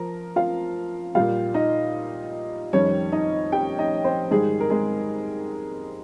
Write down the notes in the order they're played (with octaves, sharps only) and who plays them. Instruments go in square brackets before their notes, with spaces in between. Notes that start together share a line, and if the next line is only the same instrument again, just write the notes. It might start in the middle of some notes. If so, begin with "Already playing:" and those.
Already playing: [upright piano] F3 A#4 A#5
F4 F5
A#2 G3 F4 F5
D#4 D#5
F2 D#3 G3 C#4 C#5
D#4 D#5
G4 G5
D#4 D#5
C4 C5
G#2 D#3 G3 G#3 G#4
A#4
G#3 G#4